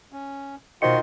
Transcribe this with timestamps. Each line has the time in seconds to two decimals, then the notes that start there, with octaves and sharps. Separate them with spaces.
0.12 C#4
0.82 B2 D#3 F4 F#4 C5 C6 C#7